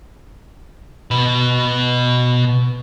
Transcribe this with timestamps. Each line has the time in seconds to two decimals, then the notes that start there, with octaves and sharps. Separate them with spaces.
1.11 B2 B4